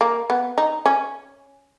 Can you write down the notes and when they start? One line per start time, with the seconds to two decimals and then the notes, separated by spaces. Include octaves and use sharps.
0.01 A#3
0.30 B3
0.58 D#4
0.86 C#4